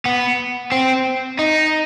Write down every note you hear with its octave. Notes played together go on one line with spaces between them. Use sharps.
B3
C4
D#4